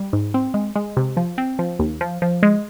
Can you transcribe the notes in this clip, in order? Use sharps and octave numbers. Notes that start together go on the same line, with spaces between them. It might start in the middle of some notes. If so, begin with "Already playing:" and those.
Already playing: G3
G#2
C4
G#3
G#3
C3
F3
C4
F3
D#2
F3
F3
G#3